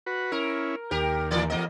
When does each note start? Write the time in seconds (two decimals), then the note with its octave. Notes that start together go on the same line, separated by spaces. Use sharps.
0.06 F#4 B4
0.32 C#4 E4 A#4
0.91 D#2 G4 A#4
1.31 A2 E3 D5
1.50 E2 A#3 D#5